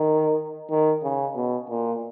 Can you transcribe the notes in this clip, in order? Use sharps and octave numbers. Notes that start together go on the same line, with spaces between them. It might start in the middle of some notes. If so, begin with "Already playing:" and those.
Already playing: D#3
D#3
C#3
B2
A#2